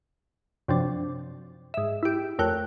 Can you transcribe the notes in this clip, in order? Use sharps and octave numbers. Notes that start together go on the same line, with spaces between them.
F#2 C3 F3 D4
G#2 E5
E4 G4
F2 A3 A#4 C#5 G5 F#6